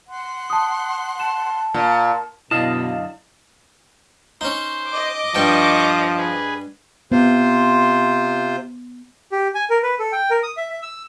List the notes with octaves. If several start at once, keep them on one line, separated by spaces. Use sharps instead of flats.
F#5 C6 F#6
A5 D#6
A5 E7
A#2
F#2 B2 D3 E4 D#5 F5 A5
C#4 D#4 C5
D#5 D6
G2 F3 G5 A5 C#6
G#4 B4
C3 B3 F4 C5
G4
G#5
A#4
B4
A4
G5
A#4
D#6
E5
E5
E6